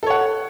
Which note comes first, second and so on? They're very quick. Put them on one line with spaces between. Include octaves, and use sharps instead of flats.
A4 C#5 F#5